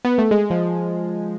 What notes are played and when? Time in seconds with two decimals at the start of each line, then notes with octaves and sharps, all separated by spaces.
0.05 B3
0.18 A3
0.31 G#3
0.50 F3